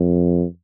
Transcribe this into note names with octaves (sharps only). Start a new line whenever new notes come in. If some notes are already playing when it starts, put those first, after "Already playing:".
Already playing: F2